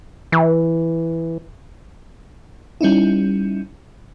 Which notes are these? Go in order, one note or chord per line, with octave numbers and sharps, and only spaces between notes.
E3
G3 C#4 D#4 E4